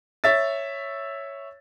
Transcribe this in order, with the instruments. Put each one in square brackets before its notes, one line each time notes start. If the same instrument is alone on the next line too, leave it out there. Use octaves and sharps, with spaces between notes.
[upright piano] C#5 E5 A6